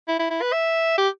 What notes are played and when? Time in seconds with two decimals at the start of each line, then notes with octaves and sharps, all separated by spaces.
0.08 E4
0.19 E4
0.30 E4
0.41 B4
0.52 E5
0.98 G4